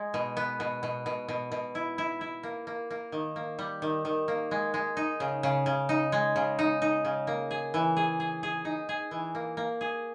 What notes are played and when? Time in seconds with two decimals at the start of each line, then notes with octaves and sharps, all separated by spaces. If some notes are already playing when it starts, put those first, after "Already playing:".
Already playing: G#3
0.14 B2
0.37 B3
0.60 B2
0.83 B2
1.06 B2
1.29 B2
1.52 B2
1.75 E4
1.98 E4
2.21 E4
2.43 A#3
2.67 A#3
2.90 A#3
3.12 D#3
3.36 A#3
3.59 G3
3.82 D#3
4.05 D#3
4.28 A#3
4.51 G#3
4.74 G#3
4.97 D#4
5.20 C#3
5.43 C#3
5.66 C#3
5.89 D#4
6.12 G#3
6.36 C#3
6.59 D#4
6.82 D#4
7.05 C#3
7.27 A#3
7.51 G#4
7.74 E3
7.97 G#4
8.20 G#4
8.43 G#4
8.65 D#4
8.89 G#4
9.11 E3
9.35 A#3
9.57 A#3
9.81 G#4